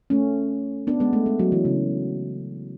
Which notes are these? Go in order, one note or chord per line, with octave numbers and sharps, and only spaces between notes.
A3 C#4
B3 D4
G#3 B3
A3
G#3
F#3
E3
C#3